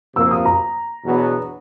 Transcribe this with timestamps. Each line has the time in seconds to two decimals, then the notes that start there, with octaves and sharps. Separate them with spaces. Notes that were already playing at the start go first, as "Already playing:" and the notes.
0.16 C3 F3 A#3 E6
0.31 D#6
0.45 A#5
1.05 E2 B2 F#3 B3 D4